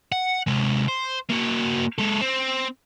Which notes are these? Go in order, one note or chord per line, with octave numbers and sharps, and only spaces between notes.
F#5
C3 G#3
C5
A#3 F#4
G#3 A4
C4